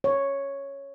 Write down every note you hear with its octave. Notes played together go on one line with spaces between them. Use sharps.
C#5